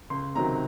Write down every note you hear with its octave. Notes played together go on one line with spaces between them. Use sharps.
C#2 C6
C3 D#3 F#3 A#5